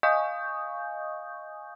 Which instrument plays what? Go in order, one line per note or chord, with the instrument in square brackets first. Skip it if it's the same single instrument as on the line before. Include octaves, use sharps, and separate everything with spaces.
[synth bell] D#5 F5 G#5 C#6 D#6 G6